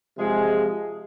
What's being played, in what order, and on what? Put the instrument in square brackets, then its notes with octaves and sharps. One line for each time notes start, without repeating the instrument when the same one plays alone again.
[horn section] C3 F3 G#3